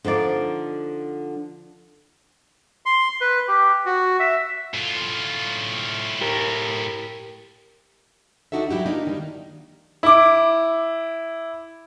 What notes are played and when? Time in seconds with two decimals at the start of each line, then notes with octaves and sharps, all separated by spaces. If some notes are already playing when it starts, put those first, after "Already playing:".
0.04 D3 F3 D#4 D5
2.86 C6
3.21 B4
3.48 G4
3.86 F#4
4.20 E5
4.74 A2 F4
6.21 G4 A#4
8.52 D#2 D4 D#4 F#4 A4 E5
8.70 F#3 G3 E4 F#4 G4
8.86 A#3 D4 D#4
9.07 D#3 G3
10.03 E4 D6